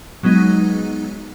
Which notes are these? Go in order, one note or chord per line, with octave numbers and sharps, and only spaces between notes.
F#3 G#3 B3 D#4